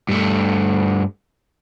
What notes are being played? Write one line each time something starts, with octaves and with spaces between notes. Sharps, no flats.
G2 A3